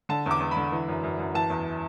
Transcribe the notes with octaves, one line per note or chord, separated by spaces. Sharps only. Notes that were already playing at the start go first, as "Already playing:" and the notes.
D3 A5
E2 D6
E2
B5
D3
E3
F#2
F#2
F#2
E3 A5
E2